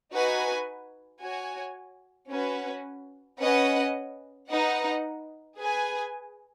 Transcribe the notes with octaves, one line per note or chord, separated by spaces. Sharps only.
D#4 F#4 B4 G#5
F#4 C#5 G#5
C#4 F#4 B4
C#4 B4 D#5 F#5
D#4 B4 D#5 F#5
G#4 B4 G#5